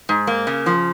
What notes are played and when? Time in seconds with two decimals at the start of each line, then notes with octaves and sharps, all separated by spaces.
0.09 G#2
0.27 A#3
0.47 C#3
0.66 F3